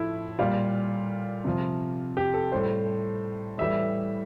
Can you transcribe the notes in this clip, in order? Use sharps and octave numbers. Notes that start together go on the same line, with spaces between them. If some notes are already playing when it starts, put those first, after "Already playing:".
Already playing: A2 F3 E4
A#2 G3 F4
C3 F3
G4
A4
A2 G3 C5
A2 E3 G3 E5